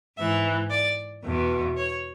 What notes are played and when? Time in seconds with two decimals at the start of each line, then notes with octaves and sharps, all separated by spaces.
0.17 G#2 E3 E5
0.70 D5
1.23 E2 B2
1.77 C#5